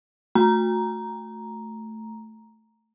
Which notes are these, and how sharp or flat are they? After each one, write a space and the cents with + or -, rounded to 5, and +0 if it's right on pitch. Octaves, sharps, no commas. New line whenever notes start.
A3 +0 A#5 +5